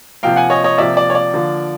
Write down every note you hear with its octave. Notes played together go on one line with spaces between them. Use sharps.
C3 F3 A#3 F5 G5
F#5 G#5
C#5 D#5
C#5 D#5
C3 F3 A#3 D5 E5
D5
C#5
D5
D3 F3 A#3